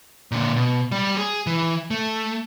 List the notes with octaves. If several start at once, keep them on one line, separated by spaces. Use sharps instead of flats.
A#2 D3
B2
G3 G4
G#4
E3
A3